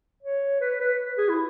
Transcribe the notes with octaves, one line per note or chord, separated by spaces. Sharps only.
C#5
B4
B4
G#4
E4